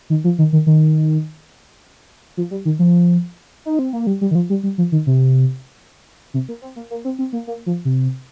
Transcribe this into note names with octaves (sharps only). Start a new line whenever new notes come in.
D#3
F3
D#3
D#3
D#3
F3
G3
D#3
F3
D#4
C4
A#3
G3
G3
D#3
F3
G3
G3
F3
D#3
C3
C3
A#3
C4
A#3
A#3
C4
C4
A#3
A#3
F3
C3